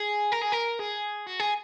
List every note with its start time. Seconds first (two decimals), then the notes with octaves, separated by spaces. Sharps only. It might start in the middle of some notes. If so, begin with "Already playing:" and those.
Already playing: G#4
0.32 A#4
0.42 G#4
0.53 A#4
0.80 G#4
1.27 F#4
1.40 G#4